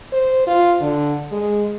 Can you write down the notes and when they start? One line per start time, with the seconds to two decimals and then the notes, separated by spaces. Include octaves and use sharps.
0.13 C5
0.47 F4
0.81 D3
1.32 G#3